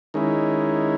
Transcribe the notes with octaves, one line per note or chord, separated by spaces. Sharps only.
D#3 G#3 C#4 E4